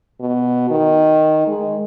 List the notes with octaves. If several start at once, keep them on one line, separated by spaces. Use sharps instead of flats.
B2
D#3
G#3